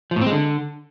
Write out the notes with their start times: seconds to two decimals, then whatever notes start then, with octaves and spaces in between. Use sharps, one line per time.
0.11 F3
0.16 A2
0.21 C4
0.26 G#3
0.32 D3